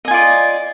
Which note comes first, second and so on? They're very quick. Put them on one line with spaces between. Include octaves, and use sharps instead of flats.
D#5 G#5 F4 D5